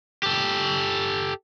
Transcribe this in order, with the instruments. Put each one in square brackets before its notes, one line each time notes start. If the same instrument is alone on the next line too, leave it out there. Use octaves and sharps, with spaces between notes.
[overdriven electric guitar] G4 A4